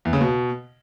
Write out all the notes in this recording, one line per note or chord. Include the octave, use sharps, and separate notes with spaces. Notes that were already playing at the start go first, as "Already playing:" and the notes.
E2
C#3
B2